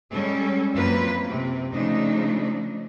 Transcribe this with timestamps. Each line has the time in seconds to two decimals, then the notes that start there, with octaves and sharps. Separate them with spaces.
0.12 G3 G#3 C#4 A4
0.73 F#2 F3 A#3 C4 F4 B4
1.29 C3
1.74 C#3 F3 A3 D4 D#4